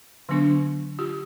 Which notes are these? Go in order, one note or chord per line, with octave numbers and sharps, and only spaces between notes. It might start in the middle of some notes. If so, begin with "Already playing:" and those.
D3 F#3 B3 D4
F4 G4